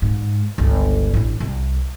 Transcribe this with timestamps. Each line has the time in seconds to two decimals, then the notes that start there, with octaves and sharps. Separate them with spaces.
0.02 G#2
0.58 G1 C#2
1.14 A1 D4
1.40 C2